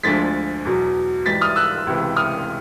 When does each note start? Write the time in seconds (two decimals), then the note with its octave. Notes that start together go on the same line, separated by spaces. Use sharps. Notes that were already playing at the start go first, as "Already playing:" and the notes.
0.03 D2 D3 F3 G#3 A6 B6
0.65 E2 B2 F#3
1.26 G#2 E3 G3 A6 B6
1.41 D#6 F6
1.56 E6 F#6
1.87 C#2 C3 E3
2.16 D#6 F6